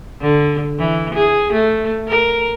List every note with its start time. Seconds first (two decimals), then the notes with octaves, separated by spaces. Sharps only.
0.22 D3
0.79 E3
1.14 G#4
1.53 A3
2.08 A#4